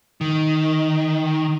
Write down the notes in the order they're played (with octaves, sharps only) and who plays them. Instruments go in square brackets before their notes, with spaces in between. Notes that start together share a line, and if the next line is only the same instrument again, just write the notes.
[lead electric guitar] D#3